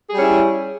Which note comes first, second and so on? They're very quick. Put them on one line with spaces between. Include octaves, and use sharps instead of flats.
G#4 G3 C#4 E4